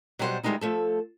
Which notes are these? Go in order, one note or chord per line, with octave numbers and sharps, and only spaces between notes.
B2 F#3 G3 G#4 C5 F#5
D#3 G3 G#3 B3 D#4 E4
F3 A3 A4